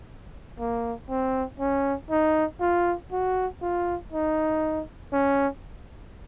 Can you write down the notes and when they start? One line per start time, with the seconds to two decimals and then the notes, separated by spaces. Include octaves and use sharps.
0.59 A#3
1.10 C4
1.60 C#4
2.10 D#4
2.61 F4
3.12 F#4
3.62 F4
4.12 D#4
5.13 C#4